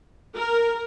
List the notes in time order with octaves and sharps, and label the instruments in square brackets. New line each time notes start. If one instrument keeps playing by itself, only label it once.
[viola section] A#4